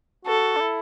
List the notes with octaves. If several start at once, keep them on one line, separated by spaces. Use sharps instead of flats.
F#4 A4
D4
E4